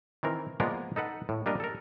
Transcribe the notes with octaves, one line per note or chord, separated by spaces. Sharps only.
D#3 E3 C4 A#4
F3 G#3 A#3 B3 A#4 D5
D#4 A4 B4 F#5
A2
G3 A#3 D4 A#4 D#5
A4 A#4